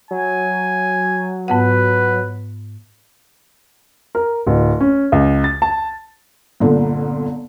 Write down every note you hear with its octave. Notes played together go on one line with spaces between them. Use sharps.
F#3 G#5
G#2 B3 B4 F#5
A#4
D1
C#4
C#2
A6
A5
G1 C2 A#2 D3